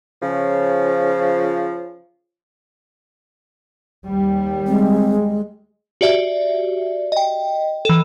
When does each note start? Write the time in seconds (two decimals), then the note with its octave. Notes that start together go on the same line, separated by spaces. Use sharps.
0.22 C#3 F3
4.06 D#2 G3
4.67 G#3 C4
6.01 F#4 G4 D5 E5
7.12 D#5 G5
7.85 E3 A4